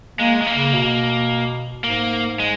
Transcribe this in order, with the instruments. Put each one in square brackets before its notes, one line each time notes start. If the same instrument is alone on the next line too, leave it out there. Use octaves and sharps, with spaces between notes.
[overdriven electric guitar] G#3 [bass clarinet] A#3
[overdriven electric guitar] G#3
A#3
[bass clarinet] C#3
B2
[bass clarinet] G#2 [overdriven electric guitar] A#3
[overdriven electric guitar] G#3